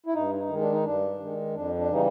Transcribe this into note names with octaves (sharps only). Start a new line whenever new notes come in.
E4
G2 D#4
D#4
D#3 G#3
D4
D#4
G2 D4
D#3 G#3
F2 D4
D4
C#3 E3 G3 D#4